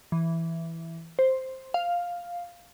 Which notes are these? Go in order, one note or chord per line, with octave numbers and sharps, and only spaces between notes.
E3
C5
F5